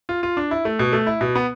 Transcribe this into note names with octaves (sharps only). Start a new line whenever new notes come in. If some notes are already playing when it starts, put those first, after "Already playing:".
F4
F4
D4
E4
A3
B2
A3
E4
B2
B3